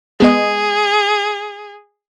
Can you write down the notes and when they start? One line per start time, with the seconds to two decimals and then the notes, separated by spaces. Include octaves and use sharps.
0.20 G#3 B3 G#4 D#5